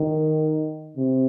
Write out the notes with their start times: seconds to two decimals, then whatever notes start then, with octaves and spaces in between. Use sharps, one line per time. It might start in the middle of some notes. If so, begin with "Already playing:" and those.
Already playing: D#3
0.97 C3